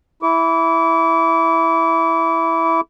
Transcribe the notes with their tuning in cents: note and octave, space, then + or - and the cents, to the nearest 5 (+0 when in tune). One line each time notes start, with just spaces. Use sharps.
E4 +0 D6 -35